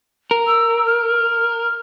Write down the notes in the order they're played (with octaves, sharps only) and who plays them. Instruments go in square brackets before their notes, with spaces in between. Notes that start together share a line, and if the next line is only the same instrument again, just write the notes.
[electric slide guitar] A#4
[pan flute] E6
F6